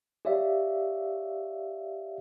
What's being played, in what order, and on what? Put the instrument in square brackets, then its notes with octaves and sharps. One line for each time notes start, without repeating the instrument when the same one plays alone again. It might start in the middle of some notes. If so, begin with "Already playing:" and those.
[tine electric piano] G4 C#5 D5 E5 F5